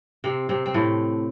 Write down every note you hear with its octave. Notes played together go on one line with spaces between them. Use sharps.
C3 C4
C3 C4
C4
A2 A3